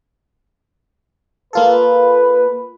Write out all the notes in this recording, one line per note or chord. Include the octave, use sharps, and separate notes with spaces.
A#3 F4 A4 B4